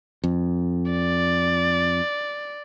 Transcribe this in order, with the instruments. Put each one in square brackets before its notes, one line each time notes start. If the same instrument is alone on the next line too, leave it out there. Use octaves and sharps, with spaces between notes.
[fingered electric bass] F2
[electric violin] D5